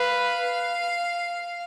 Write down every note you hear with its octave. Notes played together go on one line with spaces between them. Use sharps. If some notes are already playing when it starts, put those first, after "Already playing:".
Already playing: B4 F5